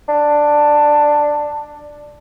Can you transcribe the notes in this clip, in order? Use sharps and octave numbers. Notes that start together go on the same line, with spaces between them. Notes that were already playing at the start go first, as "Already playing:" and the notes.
D4